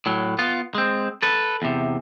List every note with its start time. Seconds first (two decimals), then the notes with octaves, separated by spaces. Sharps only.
0.06 A2 F#3
0.39 B3 F4
0.75 G#3 C4
1.22 A4 B4
1.62 E2 C3